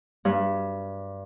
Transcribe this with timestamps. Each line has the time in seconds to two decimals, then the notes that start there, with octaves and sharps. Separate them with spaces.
0.25 G2